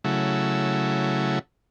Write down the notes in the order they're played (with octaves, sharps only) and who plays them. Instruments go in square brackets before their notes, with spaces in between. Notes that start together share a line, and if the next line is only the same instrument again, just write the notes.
[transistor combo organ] C#3 F#3 A3 E4